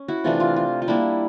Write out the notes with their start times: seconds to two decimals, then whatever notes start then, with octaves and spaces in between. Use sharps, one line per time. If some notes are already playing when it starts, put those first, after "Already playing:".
Already playing: C#4
0.08 E4 F#4
0.24 C3 E3 A3 D4 F4
0.40 F4
0.56 F4
0.82 F4
0.88 G3 A#3 D4 E4